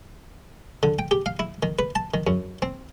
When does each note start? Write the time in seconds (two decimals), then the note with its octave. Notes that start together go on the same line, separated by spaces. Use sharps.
0.83 D3
0.99 G5
1.11 G4
1.26 F5
1.39 E4
1.63 D#3
1.79 B4
1.95 A5
2.14 D#3
2.27 F#2
2.62 C4